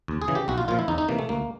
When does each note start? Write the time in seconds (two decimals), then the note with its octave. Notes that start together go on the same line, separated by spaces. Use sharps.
0.08 D#2
0.22 G#4
0.28 C#3 E3
0.35 G4
0.48 B1 F#4
0.58 F4
0.68 A#2 F3 F4
0.79 E4
0.88 E2 D#4
0.98 D#4
1.09 C3 E3 A#3
1.19 A3
1.29 D2 A#3